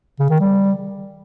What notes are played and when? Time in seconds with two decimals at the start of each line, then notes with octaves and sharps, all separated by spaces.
0.20 C#3
0.30 D#3
0.40 G3